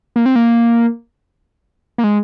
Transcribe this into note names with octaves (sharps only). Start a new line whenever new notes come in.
A#3
C4
A#3
A#3
G#3